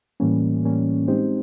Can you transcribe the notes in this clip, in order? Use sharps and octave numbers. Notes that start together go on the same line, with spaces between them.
A2 E3 G3 A#3 C#4
A2 E3 G3 A#3 C#4
G#3 C4 D#4 G4 C5